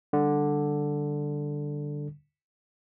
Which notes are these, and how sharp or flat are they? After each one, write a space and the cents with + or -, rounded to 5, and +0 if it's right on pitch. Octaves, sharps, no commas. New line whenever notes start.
D3 +0 G3 +5